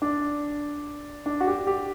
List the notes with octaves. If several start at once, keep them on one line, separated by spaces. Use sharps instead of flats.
D4
D4
F#4
G4
G4